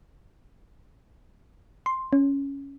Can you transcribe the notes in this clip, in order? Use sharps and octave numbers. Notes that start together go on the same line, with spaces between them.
C6
C#4